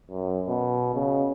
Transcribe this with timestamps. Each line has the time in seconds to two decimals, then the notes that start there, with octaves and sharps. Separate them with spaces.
0.10 F#2
0.48 B2
0.94 C#3